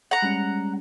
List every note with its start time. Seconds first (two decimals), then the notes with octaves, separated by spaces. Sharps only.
0.11 F#5 A#5
0.22 G3 G#3 C#4